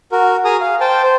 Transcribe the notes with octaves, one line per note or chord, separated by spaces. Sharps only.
F#4 A#4
G#4 G#5 A#5 D#6
F5
C5 G5 A5
C5